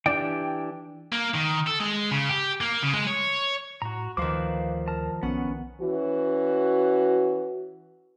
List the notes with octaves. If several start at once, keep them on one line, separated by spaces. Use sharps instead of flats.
E3 D4 G4 D5 G5
A#3
D#3
A4
G#3
C#3
G4
A#3
C#3
G#3
C#5
A2 F#4 A#5
D2 D#3 F3 B4 F5 D6
A#4 A5
B1 B3 C#4 F#5
E3 C#4 F#4